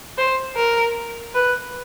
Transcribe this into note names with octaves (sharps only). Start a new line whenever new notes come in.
C5
A#4
B4